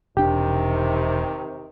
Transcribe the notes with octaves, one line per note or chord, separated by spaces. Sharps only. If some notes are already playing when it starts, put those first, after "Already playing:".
E1 C3 D#3 D4 G4 G5